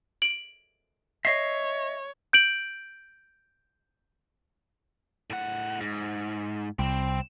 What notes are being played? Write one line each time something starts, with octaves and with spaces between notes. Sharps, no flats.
D7 F#7
C#5 D#5 E5 C7
G6 D7 F#7
A2 F#5
G#2
C2 C4